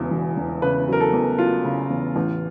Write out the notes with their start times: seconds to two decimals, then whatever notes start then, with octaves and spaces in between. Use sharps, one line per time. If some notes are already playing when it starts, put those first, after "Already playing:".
Already playing: E1 E2 C#3 E4
0.11 E1
0.37 E1
0.62 C#3 B4
0.88 F#3 A#4
1.00 A4
1.13 E2
1.38 F#3 F4
1.64 C#3
1.90 E2
2.16 A1